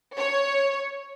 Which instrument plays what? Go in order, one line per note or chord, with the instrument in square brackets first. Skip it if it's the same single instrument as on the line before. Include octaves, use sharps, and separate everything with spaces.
[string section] C#5